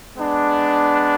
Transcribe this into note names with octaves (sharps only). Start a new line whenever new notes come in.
G#3 B3 D4